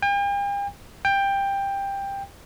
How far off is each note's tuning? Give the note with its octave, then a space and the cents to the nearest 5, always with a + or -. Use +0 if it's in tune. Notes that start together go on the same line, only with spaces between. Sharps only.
G5 +45
G5 +15